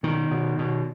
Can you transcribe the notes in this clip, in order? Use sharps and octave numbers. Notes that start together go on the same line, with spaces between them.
B2 D#3
B2
B2